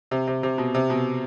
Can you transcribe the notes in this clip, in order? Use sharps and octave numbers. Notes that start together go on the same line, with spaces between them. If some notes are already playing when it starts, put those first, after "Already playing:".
C3
C3
C3
B2
C3
B2